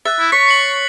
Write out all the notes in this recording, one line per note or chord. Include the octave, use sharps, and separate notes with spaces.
E5 F#6 A6
E4
C#5 C#6 B6
C7 C#7 F#7